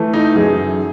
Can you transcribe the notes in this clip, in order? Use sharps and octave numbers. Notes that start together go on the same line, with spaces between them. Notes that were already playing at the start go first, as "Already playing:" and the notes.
Already playing: E3 A3
D#4
F#2 G#4